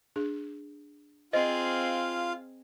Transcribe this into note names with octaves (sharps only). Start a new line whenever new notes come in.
D4 G#4
C4 F4 G#4 C5 D#5 F5